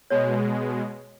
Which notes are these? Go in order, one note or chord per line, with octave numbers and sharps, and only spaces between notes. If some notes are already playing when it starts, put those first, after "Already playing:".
B2 G#3 C#5